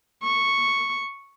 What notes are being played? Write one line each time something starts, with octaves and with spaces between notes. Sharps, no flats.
C#6